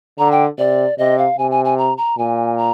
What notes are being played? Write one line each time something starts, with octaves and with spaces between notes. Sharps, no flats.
D3 A#5
G5
C3 D5
C3 D#5
F5
C3 G#5
G#5
G#5
A#5
A#5
A#2 G#5
A#5